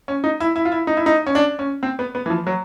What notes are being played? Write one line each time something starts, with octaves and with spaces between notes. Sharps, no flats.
C#4
D#4
E4
E4
F4
E4
D#4
E4
D#4
C#4
D4
C#4
C4
B3
B3
E3
F3
F#3